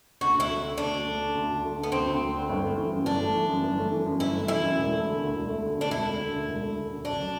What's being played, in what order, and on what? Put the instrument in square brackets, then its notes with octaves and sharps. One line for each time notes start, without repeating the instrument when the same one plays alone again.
[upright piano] D2 [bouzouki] F#4
[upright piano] D2 [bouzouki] E4
[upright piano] A3
D3
[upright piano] D2 [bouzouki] D4
[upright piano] D2
A3
D3
D2
D2
A3
D3
[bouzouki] B3
[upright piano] D2 [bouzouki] C4
[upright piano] D2
A3
D3
G1
A3
E3
F#2
[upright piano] G1 [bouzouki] D4
[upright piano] A3
E3
F#2
G1
A3
E3
F#2
[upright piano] G1 [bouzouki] E4
[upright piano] A3
[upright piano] E3 [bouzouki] E4
[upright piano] F#2
E1
A3
D3
D2
E1
A3
D3
[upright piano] D2 [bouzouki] D4
[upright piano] E1 [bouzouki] E4
[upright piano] A3
D3
D2
E1
A3
D3
D2
[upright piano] F#1 [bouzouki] D4
[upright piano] F#3